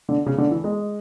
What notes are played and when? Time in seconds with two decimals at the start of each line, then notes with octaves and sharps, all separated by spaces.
0.09 D3
0.26 C#3
0.38 D3
0.51 E3
0.64 G#3